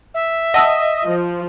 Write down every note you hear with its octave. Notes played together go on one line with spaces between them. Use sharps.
E5
D#5 F#5 A5 E6
F3